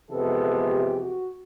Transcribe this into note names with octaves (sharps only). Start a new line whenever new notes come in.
F2 C3 E3 G#3 B3 A4
G4
F#4